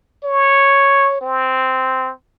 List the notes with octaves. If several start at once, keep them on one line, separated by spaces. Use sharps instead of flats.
C#5
C4